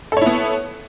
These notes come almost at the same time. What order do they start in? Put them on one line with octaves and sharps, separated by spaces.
A4 C#5 E4 B3